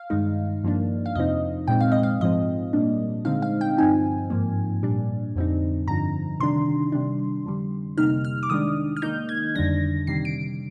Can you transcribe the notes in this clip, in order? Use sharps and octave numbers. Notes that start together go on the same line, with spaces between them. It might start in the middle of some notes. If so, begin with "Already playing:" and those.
Already playing: F5
G2 D#3 G#3 D#4
G2 F3 A#3 D4
F5
F2 C3 F3 C4 D#4 D#5
A#2 G#3 C4 G5
F5
D#5
F5
G#2 F3 G#3 C4 D#5
A#2 G3 A#3 D4
D3 G#3 C4 D#4 F5
F5
G5
G2 F3 C4 D#4 G#5
G#2 F3 A#3
A#2 G3 D4
F2 D3 G3 C4 D#4
G2 D3 F3 A#5
C3 D#3 G3 D4 C6
C3 G3 D4
F2 D3 G3
C3 G3 A#3 D#4 F6
F6
D6
D#3 G#3 D4 D#6
F6
D#3 A#3 D#4 G6
G#6
F2 D3 G3 D4 A#6
C3 D#3 G3 C7
D7